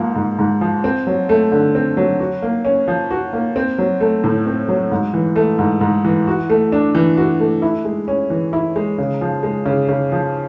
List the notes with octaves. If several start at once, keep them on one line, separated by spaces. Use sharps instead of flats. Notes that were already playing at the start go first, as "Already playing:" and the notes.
Already playing: G#2 F3 A#3
G#2
G#2
F3
C4
F#3
A3
D3
C4
F#3
F#4
A#3
C#4
F3
F#4
A#3
C4
F#3
A3
A2
C4
F#3
G#2
E3
A3
G#2
G#2
E3
F#4
A3
D4
E3
F#4
A3
E4
G#3
C#4
E3
E4
G#3
C#3
F3
G#3
C#3
C#3
F3